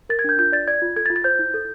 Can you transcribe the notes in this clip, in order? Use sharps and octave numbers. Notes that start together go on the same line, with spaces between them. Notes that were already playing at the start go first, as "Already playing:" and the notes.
A#4 A6
G#6
D4 G6
F4 G6
D5 A6
D5 G#6
F4
A4 G#6
A6
F4
A6
C5 G6
E4
A4